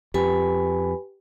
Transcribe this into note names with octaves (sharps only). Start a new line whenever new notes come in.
F2 G4 B4 G#5 B5